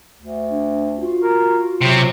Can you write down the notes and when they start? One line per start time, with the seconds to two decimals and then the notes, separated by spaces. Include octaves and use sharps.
0.21 D2
0.50 D4
1.01 F4 F#4
1.22 A#4
1.81 C3 F#3 C4